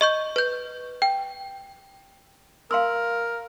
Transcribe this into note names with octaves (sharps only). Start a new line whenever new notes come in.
D#5 C#6 G6
B4 G6
G5
A#4 F5 C6 E6